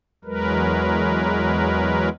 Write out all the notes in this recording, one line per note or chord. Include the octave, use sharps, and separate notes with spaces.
E2 F#3 G#3 A#4 B4